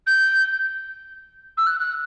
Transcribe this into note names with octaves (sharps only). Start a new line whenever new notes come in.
G6
E6
F#6
F#6